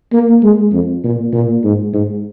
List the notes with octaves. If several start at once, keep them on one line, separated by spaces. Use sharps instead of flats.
A#3
G#3
F2
A#2
A#2
G#2
G#2